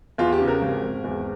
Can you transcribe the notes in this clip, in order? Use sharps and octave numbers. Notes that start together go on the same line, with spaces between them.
E2 F4
G4
C#3
A#4
G#1
G#1
E2